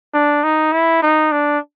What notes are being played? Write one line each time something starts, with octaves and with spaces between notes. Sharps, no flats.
D4
D#4
E4
D#4
D4